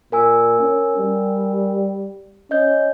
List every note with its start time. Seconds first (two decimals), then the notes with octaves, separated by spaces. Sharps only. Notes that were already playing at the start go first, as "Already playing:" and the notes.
0.12 A#2 A#4 G#5 E6
0.60 C#4
0.97 G3
2.51 C#4 D#5 G6